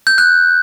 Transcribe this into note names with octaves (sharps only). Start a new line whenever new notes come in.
G6
F#6